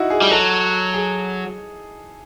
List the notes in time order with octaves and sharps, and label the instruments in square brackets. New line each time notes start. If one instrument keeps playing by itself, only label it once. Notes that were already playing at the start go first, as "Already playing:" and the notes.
Already playing: [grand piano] D#4 E4 F#4
G#4
[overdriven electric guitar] G3
[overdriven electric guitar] F#3 [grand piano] A4
[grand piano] G#4